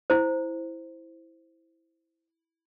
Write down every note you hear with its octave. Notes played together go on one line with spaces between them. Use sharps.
E4 C5